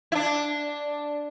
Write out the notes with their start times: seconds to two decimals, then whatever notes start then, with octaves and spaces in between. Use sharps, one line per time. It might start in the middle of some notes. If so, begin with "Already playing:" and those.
0.12 E4
0.15 D4